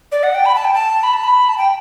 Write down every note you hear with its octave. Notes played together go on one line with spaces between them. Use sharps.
D5
F#5
G5
B5
A5
G5
A5
B5
A5
B5
A5
G5